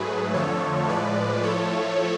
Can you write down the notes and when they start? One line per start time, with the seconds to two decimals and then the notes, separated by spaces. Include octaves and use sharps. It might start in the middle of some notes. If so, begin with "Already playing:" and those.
Already playing: G#2 F#3 A3 G#4 B4
0.34 F2 D3 F3 A3 A4 C#5
0.88 A2 F3 G#3 B4 D5
1.43 A2 F3 A3 A4 C#5